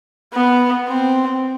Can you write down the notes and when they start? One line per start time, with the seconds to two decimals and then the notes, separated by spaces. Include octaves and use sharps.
0.33 B3
0.88 C4